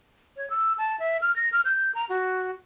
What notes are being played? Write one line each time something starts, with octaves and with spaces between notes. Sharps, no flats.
C#5
E6
A5
E5
F6
A#6
F6
G6
A#5
F#4